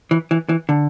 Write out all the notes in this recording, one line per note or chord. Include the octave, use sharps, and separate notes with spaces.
E3
E3
E3
D3